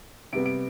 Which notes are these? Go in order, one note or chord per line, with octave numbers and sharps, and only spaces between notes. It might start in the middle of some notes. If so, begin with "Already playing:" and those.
C3 G3 B3 D7
D7